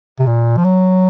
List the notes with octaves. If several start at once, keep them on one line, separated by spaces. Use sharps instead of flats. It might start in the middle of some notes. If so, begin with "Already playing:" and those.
C3
A#2
F3
F#3